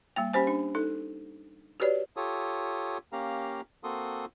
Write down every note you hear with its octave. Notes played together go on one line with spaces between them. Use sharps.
G3 A#3 G5
C#4 G4 C5 G#5
D4
D#4 A4
F#4 G4 B4 C#5 D5
F4 G4 A4 C#5 D#6
A#3 C#4 G4 F5 A#5
A#3 C4 F#4 A4 C6 D#6